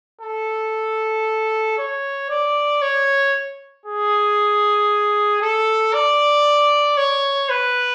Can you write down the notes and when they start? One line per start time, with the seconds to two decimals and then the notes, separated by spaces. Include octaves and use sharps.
0.22 A4
1.78 C#5
2.30 D5
2.82 C#5
3.86 G#4
5.42 A4
5.94 D5
6.97 C#5
7.50 B4